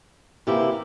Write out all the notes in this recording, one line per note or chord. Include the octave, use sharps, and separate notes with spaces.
C3 E3 A#3 E4 G4